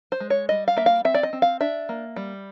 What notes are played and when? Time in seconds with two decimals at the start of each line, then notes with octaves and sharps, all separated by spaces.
0.12 C5
0.20 G#3
0.30 C#5
0.49 G3 D#5
0.68 F5
0.77 A#3 E5
0.86 F5
1.05 C4 E5
1.14 D5
1.23 D#5
1.33 C4
1.42 F5
1.61 D4 E5
1.89 A#3
2.16 G3